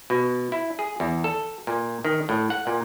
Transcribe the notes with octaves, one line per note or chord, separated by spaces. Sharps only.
B2
E4
G#4
E2
A4
A#2
D#3
A2
F#5
A#2